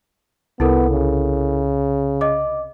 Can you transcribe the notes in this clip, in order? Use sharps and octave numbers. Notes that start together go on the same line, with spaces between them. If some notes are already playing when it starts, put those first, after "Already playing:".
C2 B3 E4 A4 A#4
C#3
D#5 D6